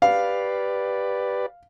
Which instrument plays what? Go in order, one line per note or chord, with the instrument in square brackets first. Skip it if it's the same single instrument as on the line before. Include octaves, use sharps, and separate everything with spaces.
[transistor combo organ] G4 B4 D5 [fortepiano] F5